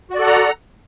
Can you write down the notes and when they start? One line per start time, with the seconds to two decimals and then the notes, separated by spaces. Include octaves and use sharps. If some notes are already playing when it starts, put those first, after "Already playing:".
0.10 F#4
0.15 D5
0.19 A4
0.23 F#5
0.27 A#5